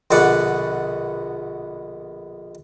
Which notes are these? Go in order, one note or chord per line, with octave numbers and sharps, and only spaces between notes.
A#1 B2 D3 D5 F#5